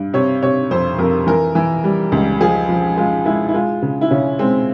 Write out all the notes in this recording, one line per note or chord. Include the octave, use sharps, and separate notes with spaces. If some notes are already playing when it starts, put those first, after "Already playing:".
Already playing: G2
C3 C#5
C3 C#5
F2 C5
F2 A#4
E3 A#4
E3
G3
C#2
F3 G#4
F3
G#3 F4
G#3 E4
E4
G#3 F4
C#3
E4
C#3 C#4
G#3 C4